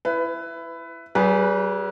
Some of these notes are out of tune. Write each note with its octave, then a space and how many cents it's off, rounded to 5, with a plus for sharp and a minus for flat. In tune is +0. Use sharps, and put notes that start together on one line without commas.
E4 +15 B4 +15
G3 -40 G#4 +0 B4 -10